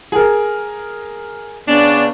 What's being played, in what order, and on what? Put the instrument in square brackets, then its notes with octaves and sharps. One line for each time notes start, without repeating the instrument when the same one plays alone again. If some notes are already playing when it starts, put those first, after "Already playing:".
[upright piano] G#4 A#4
[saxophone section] C#3 C#4 D4 [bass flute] B3